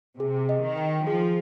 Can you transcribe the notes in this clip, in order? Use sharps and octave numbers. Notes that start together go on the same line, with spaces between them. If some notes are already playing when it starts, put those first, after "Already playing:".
C3 G#4
D#5
D#3
G5
F3 G#4